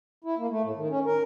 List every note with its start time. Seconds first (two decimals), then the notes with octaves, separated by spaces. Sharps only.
0.24 E4
0.38 A#3
0.50 A3
0.63 A2
0.76 D#3
0.89 C#4
1.05 A#4